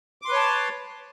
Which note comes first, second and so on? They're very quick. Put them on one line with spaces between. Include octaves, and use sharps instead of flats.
D6 C6 B4 C#5 A5